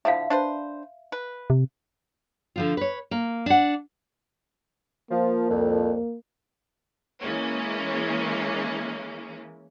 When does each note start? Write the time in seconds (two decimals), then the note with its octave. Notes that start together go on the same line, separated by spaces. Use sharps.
0.05 D3 F3 E4 E5 F5
0.30 D4 B4 C5
1.12 B4
1.50 C3
2.56 D3 F3 F4
2.77 B4 C#5
3.11 A#3
3.46 D4 F#5
5.11 F3 A#3
5.50 C2 F2
7.22 E3 G#3 A#3 C#4